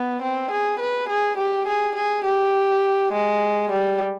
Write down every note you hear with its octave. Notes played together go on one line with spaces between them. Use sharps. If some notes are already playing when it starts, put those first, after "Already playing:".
Already playing: B3
C4
G#4
B4
G#4
G4
G#4
G#4
G4
G#3
G3